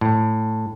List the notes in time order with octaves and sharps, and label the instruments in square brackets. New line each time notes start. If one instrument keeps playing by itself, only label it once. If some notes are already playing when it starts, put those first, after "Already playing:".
[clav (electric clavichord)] A2